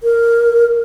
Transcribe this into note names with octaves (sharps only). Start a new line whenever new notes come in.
A#4